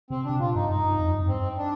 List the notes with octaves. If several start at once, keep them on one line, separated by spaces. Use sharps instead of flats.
C3 C4
C3 D4
A#2 F4
G2 D#4
G2 D#4
G2
F2
G2
F2
G2 C4
D4